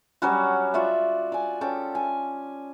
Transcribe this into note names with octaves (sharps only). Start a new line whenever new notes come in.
F#3 G3 C#4 F#4
F4 F#4 D5 E5
D5 G#5
C#4 A4 G5
G#5